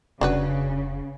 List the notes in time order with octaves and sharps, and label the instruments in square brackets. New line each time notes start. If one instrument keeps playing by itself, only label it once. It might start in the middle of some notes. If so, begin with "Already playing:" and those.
[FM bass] F1 [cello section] C#3 [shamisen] D4 F#4 B4